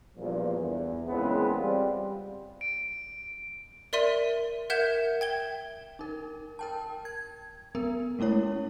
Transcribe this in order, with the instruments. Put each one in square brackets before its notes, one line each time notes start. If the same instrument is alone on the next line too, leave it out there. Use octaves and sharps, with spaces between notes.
[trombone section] E2 G2 A#2 F3
E2
A#2 C#3 E3 G#3 B3 C4
G3 C4 F4
[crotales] D7
[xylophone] A#4 D5 E5 C6 D#7
A#4 E5 F#5 G6 G#6 E7
G5 G#6 G7
[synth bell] D#4 A#4
A#4 G5 A5
G#6
B3 A#4
G#3 A3 C#4 E4 C#5